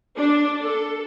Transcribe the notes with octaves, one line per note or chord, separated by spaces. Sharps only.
D4
A4